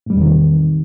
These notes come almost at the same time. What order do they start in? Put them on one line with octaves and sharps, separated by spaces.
A2 G3 E2 C3 D#3